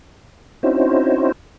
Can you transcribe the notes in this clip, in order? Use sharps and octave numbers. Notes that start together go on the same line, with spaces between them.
C4 C#4 D#4 E4 F#4 C5